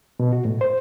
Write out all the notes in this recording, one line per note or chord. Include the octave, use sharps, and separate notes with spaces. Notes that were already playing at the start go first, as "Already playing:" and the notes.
B2
F#4
A2
C5